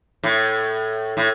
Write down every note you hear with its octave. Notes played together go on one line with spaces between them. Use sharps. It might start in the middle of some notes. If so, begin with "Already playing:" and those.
A2
A2